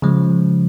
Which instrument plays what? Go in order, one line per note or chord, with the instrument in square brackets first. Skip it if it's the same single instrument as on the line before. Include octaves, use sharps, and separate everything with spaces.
[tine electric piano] C#3 F3 G#3